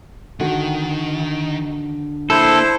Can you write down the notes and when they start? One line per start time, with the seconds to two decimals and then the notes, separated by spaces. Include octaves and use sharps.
0.40 D3 D#3 F#4
2.30 A#3 D4 E4 A4 C5